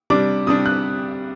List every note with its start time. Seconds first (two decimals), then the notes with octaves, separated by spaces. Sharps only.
0.10 C3 G3 D4 D6
0.47 C3 G3 D4 D#6
0.66 F#6